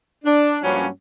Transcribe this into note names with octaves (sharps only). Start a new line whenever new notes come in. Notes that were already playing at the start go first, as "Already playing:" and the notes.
D4
G2 F3 F#3 A#3 C#4